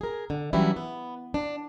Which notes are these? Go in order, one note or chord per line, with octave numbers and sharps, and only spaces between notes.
G#4 A#4
D3
E3 F#3 G3 C#4 D4 E4
B3
D4